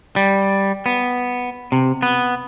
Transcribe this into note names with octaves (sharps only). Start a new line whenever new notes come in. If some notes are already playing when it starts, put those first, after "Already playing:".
G3
B3
C3
B3